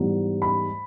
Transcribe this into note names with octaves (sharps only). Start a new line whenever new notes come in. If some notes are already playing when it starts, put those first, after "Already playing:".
Already playing: G#2 E3 G3 B3 D#4
B5